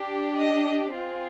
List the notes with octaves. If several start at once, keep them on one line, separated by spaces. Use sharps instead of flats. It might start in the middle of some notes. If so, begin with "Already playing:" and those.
Already playing: D4 G4
D#5
C4 F4 G#4